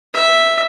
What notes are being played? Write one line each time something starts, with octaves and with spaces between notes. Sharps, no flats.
E5